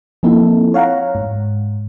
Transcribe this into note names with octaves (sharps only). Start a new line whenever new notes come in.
F3 A#3 C4 D#4 E4 A4
C#5 F5 F#5 A#5
G#2